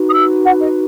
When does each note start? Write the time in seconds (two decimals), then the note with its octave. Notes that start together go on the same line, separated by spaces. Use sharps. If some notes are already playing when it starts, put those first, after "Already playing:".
Already playing: D#4 F#4 B4
0.09 D#6
0.13 E6
0.45 F#5
0.60 D#5